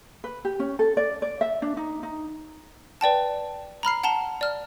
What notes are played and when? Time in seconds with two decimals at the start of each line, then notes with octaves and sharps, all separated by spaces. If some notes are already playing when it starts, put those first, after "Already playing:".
0.24 B4
0.45 G4
0.60 C#4
0.79 A4
0.97 D5
1.22 D5
1.41 E5
1.62 D4
1.77 D#4
2.03 D#4
3.01 B4 D5 G5 A5
3.83 A#5 B5 F6 C7
4.03 F#5 A5 A#5 E7 G7
4.41 D5 F6